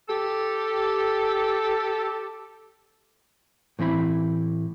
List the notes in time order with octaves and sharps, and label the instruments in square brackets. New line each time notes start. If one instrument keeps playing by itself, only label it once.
[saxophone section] G4 A4
[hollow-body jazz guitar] A2 E3 C4 E4 B5